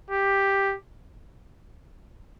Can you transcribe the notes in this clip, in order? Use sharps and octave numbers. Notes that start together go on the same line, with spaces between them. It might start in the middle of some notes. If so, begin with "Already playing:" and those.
G4